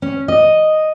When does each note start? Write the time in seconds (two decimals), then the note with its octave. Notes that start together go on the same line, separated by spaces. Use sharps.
0.02 C#4
0.28 D#5